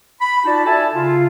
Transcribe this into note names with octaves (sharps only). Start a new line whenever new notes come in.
B5
D#4 F4 F#4 D5 A5
A4 E5 G#5 A5
C#3 F4